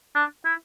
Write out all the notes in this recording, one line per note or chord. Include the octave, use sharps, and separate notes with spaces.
D4
E4